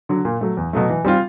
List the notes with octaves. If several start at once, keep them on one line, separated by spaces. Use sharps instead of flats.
D3 F#3
A#2
F#3 A3
E2
B2 F#3 A3
E3
G3 C4 F4